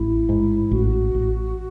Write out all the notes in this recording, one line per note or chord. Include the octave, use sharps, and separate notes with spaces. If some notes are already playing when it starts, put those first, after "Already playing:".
Already playing: A1 E4
G#2
A1 F#4
A1